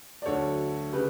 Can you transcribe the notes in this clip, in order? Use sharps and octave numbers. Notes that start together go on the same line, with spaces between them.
D5
D2 D3 F#3 A4 C#5
C#3 G4 B4